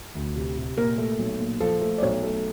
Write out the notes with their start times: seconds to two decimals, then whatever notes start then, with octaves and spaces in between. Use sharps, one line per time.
0.15 D2
0.36 C3
0.57 C3
0.77 A#2 A#4
0.98 A3
1.19 B1
1.40 A#2
1.60 F3 A4
1.81 A3
1.98 D5
2.02 B1 C#5
2.23 A3